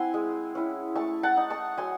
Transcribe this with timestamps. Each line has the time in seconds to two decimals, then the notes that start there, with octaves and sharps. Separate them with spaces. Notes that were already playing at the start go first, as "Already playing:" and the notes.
Already playing: C4 E4 F#5 G#5 C6
0.14 G#3
0.55 C#4 E4
0.96 A3 A5 C#6
1.23 F#5 A5
1.37 D#4
1.50 A5 C#6
1.78 F#3 G#5 C6